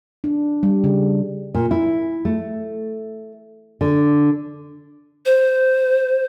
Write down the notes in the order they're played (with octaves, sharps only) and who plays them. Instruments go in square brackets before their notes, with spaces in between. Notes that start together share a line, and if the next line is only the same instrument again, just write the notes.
[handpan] D4
G3
C#3
[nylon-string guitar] A#2
E4
A3
D3
[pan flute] C5